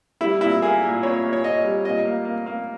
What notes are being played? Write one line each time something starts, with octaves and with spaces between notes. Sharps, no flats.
G3 E4
A#2 E4
A#3 G#4
A#2
A#2 C#5
A#2
C#5
A#2 D#5
G3
A#2 D#5
A#3
A#3
A#3